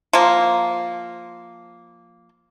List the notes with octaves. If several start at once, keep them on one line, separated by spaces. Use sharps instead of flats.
F3 A#3